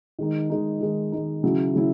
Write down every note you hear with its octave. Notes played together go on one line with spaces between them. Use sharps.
D#3 G#3 D#4
D#3 G#3 D#4
D#3 G#3 D#4
D#3 G#3 D#4
C#3 F#3 C#4 E4
C#3 F#3 C#4 E4